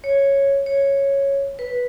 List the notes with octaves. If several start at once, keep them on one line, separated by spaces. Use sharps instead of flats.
C#5
C#5
B4